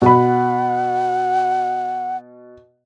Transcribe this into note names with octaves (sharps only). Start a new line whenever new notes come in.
B2 F#5 B5